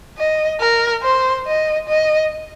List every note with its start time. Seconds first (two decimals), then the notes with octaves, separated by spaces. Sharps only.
0.18 D#5
0.60 A#4
1.03 C5
1.46 D#5
1.88 D#5